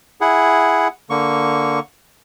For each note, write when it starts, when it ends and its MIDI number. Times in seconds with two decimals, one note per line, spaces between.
0.21 0.88 64
0.21 0.88 68
0.21 0.88 78
1.10 1.79 50
1.10 1.79 58
1.10 1.79 85